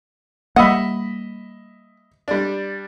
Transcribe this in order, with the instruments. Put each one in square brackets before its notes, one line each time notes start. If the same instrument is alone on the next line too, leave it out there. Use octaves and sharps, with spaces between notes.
[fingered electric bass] G3 A#3 [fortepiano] D#5 E5 B5 [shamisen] F#5
[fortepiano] G3 D4